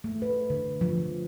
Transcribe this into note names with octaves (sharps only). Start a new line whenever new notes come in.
A3
B4
D3
F3